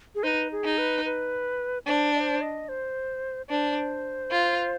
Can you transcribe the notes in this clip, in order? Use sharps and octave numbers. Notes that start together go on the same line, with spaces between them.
G#4
D#4 B4 C5
G#4
D#4
B4
B4
D4 C5
D#5
C5
D#5
C5
D4 C5
F4